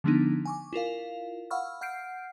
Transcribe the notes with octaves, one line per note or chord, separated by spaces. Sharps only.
D3 F3 A3 B3 D4 D#4
G#5 C#6 D6
E4 F4 A#4 F5
F5 F#5 B5 C#6 E6 F6
F#5 F6 G6 C7 D7